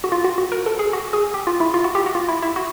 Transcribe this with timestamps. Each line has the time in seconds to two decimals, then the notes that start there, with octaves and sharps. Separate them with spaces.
0.04 F#4
0.12 F4
0.24 F#4
0.38 F#4
0.52 A#4
0.66 A4
0.79 G#4
0.93 F#4
1.13 G#4
1.34 G4
1.47 F4
1.60 E4
1.74 F4
1.84 F#4
1.95 G4
2.06 F#4
2.15 F4
2.28 E4
2.42 E4
2.56 F#4